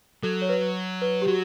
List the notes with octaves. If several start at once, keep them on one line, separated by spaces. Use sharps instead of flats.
F#3 A4
C#5
B4
B4
G4
F#3 F#4